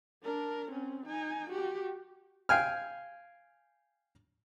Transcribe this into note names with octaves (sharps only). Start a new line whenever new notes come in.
D4 A#4
C4 C#4
D#4 G#5
F#4 G4
F5 G5 G#5 F6